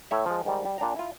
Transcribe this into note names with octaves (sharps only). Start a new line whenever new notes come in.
A2 C#5 E5
F3 G#3
G#2 D#3 G3
G3
A#2 D4 G5 A#5
E4 F4